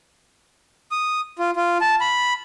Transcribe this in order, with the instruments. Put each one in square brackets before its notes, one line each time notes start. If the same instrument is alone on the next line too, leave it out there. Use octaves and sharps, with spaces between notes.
[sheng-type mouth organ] D#6
F4
F4
A5
B5